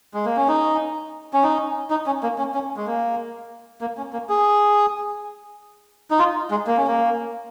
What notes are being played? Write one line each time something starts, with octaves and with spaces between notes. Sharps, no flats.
G#3
A#3
C#4
D#4
C#4
D#4
D#4
C#4
A#3
C#4
C#4
G#3
A#3
A#3
C#4
A#3
G#4
D#4
F4
G#3
A#3
C#4
A#3